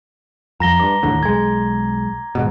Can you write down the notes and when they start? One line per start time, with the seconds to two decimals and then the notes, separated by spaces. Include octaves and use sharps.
0.60 F2 A#5 A#6 G7
0.80 G2 D6
1.03 D#2 A2 D3
1.23 B1 G#3 G#6
2.35 D#1 G#2 B2